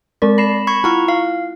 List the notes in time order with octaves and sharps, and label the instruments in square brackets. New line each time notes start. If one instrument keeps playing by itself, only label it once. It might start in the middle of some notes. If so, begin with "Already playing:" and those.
[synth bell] G#3 C4 A#4 [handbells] D5
[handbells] B5 [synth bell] A#6 C7 E7
[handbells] B5 C#6 G#6
[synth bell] E4 F4 [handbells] A#5 C#6
[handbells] F5